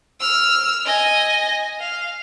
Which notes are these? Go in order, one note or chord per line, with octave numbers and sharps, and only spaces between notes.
E6 F6
D#5 G#5
F5